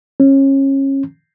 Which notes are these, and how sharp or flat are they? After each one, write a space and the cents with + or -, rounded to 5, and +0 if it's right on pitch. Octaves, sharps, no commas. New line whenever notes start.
C#4 -25